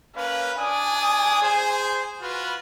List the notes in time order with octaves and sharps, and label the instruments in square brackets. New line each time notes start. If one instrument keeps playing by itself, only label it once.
[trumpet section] A#3 C#4 B4 [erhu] F5
[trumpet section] D4 D5 D#6 [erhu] G#5
[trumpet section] G#4 C5
F4 F#4 B4